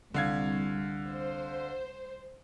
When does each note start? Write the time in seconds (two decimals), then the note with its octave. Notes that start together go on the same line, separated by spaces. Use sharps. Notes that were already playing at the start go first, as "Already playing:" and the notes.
0.14 C2 D3 F5 G#6
1.08 C5